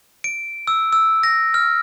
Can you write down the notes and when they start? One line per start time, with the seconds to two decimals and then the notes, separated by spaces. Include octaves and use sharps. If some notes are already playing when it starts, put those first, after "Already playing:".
0.24 D7
0.67 E6
0.93 E6
1.23 A#6
1.54 F6